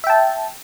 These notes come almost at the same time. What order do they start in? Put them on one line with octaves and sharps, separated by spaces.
E5 G5 A5